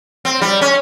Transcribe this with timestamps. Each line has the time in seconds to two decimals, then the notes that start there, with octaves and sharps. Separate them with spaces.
0.25 C4
0.41 G3
0.61 C#4